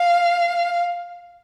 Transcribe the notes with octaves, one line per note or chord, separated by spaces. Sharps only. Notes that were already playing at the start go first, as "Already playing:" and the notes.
Already playing: F5